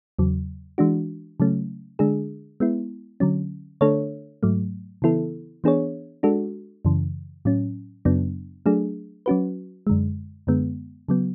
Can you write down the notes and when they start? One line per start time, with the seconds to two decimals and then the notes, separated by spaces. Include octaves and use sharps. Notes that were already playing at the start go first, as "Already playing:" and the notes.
0.19 E2 C#3 F#3
0.78 E3 G#3 D4 F#4
1.40 C#3 F#3 A3 C#4
1.99 D3 G#3 D4 G#4
2.60 G#3 B3 E4
3.20 D3 F#3 C#4
3.81 D3 A3 D4 A4 C#5
4.43 G#2 F#3 A3
5.02 C#3 E3 B3 E4 A4
5.64 E3 B3 D4 G#4 C#5
6.23 G#3 D4 F#4 A4
6.85 F#2 C#3 E3
7.45 A2 F#3 C#4
8.05 F#2 C#3 F#3 B3 D4
8.66 F#3 A3 D4 G#4
9.26 F#3 C#4 F#4 B4
9.87 F#2 D3 G#3
10.47 F#2 D3 G#3 B3
11.08 C#3 F#3 B3